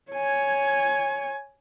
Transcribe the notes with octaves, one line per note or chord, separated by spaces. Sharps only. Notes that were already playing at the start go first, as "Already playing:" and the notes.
C#5 G#5